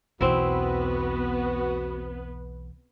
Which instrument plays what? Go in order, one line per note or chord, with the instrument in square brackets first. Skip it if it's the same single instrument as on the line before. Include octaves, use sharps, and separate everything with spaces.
[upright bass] B1 E2 [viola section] B3 B4 [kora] C4 E4 [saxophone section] F#4